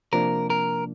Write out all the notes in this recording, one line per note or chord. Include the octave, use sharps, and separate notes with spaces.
C3 F3 A#3 D4 A#4
A#4